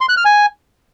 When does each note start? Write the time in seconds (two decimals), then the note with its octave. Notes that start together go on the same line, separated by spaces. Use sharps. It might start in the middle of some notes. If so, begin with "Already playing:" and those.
0.01 C6
0.09 F#6
0.17 F6
0.25 G#5